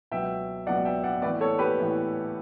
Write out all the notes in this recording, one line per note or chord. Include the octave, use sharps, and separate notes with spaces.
C#2 B2 F#3 B3 E5 G5
C#2 B2 F#3 B3 D5 F#5
E5 G5
D5 F#5
A2 E3 B3 B4 D5
A4 C#5
G4 B4
A2 E3 B3